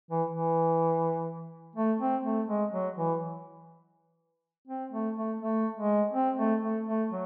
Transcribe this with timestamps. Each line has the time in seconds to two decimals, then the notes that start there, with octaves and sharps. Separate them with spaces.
0.11 E3
0.30 E3
1.76 A3
1.99 C4
2.24 A3
2.48 G#3
2.72 F#3
2.96 E3
4.68 C4
4.92 A3
5.16 A3
5.40 A3
5.77 G#3
6.13 C4
6.38 A3
6.62 A3
6.87 A3
7.11 F#3